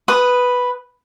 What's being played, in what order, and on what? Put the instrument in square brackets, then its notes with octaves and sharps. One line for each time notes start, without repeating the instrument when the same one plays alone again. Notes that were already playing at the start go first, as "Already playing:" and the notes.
[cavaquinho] B4 D#6